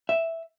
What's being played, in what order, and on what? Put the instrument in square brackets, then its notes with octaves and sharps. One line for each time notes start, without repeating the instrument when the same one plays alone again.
[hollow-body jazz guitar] E5